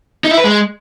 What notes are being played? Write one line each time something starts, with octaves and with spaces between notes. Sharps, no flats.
D#4
E4
B4
G#3